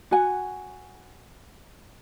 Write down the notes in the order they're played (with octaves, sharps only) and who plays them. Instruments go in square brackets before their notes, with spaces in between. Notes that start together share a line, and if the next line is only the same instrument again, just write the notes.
[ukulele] F#4 F#5 G#5